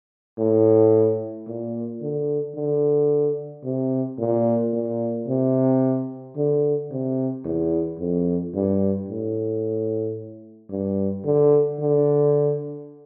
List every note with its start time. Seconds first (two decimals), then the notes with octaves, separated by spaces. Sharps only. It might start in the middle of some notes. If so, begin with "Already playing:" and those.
0.38 A2
1.47 A#2
2.01 D3
2.55 D3
3.64 C3
4.19 A#2
4.73 A#2
5.28 C3
6.37 D3
6.91 C3
7.44 E2
7.99 F2
8.54 G2
9.08 A2
10.70 G2
11.25 D3
11.80 D3